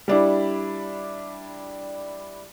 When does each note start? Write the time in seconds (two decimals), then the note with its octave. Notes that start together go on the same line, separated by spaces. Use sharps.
0.08 G3 D4 E4